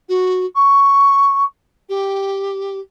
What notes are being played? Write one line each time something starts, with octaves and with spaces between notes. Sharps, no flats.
F#4
C#6
G4